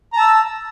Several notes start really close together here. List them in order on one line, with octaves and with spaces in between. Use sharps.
A#5 A5 E6